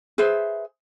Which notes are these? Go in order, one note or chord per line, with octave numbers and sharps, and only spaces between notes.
G#4 B4 C5 E5